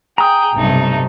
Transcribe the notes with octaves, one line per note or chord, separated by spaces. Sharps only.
G#4 G5 A#5 D#6
B1 G2 C3 A3 D#4